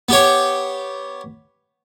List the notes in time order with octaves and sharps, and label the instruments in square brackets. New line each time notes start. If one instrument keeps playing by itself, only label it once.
[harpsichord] B3 G4 C#5